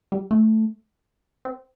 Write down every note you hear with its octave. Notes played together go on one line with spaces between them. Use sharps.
G3
A3
C4